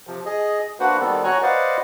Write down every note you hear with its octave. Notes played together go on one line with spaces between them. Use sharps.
C3 F3
G#4 D#5
A#3 D4 F#4 B4 C5 F#5
D#3 G3 B3 C4 A4
F#4 C#5 G#5 A#5 C#6 F#6
B4 C5 D5 D#5 F5 F#5